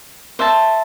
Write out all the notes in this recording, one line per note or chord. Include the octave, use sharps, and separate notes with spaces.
C5 E5 A5